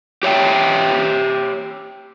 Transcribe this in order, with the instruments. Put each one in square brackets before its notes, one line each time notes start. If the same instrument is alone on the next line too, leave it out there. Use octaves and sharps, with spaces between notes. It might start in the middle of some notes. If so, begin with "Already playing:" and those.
[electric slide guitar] G4 C#5 E5 G5